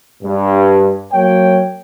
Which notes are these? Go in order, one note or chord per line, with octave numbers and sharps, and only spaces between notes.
G2
F#3 A#3 C#5 G5